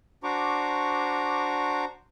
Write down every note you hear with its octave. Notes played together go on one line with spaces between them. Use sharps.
D4 F#4 C5 A#5 C#6 D6